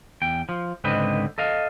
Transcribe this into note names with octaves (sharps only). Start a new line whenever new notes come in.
E2 G5
F3
C#2 G#2 D3 C4 B4 D#5
A4 D#5 F5